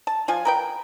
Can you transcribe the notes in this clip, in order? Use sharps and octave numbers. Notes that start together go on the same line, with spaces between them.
A5
F3 F4 G#5
A#4 B4 G5